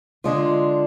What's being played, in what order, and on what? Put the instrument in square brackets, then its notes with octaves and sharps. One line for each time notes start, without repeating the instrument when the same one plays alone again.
[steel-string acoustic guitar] D3 G#3 D4 F4